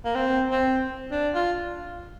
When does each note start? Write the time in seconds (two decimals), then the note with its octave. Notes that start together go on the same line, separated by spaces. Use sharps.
0.05 A#3
0.15 C4
0.51 C4
1.11 D4
1.35 F4